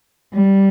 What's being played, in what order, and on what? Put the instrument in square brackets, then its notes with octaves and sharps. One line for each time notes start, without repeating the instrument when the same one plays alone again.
[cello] G3